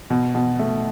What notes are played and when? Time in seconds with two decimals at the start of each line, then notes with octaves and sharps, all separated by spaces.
0.10 B2
0.35 B2
0.59 A3